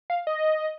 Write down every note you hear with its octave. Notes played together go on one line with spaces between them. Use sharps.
F5
D#5